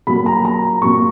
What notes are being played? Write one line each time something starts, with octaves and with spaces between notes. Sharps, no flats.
A#2 F#3 A#3 B5
A#5
A#5
A#2 F#3 A#3 C#6